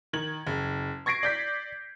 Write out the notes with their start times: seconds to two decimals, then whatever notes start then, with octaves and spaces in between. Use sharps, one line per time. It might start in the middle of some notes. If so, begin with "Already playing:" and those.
0.13 D#3 G#6 F#7
0.47 F#1
1.06 C#6 G#6 A#6 C7 D7
1.23 D5 G6 B6